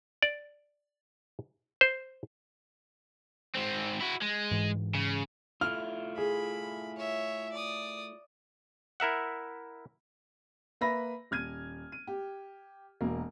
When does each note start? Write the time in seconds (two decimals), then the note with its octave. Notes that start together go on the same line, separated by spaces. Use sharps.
0.22 D5
1.81 C5
3.55 G#2 C4
4.00 E4 F#4
4.22 G#3
4.51 G#2 E3
4.95 C#3
5.61 A3 E4 F4 F6
6.17 G#4 B5
6.97 C#5 E5
7.52 D5 D#6
9.00 E4 A#4 E5 F#5
10.81 A#3 B4 E5 B5 A#6
11.31 D#1 F6 G#6 D#7
11.92 D#7
12.07 G4
13.01 E1 A#3